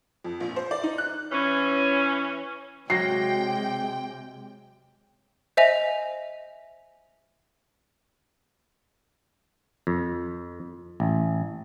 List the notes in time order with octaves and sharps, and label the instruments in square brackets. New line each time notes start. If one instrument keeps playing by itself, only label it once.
[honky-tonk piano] F2
A#1
C5
D5
D#4
F#6
[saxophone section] E3 C#4
[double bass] C3 G#3 [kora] F#3 [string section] G5 [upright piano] A#6 C7
[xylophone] C5 D#5 E5 G#5 F7
[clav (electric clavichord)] F2
A1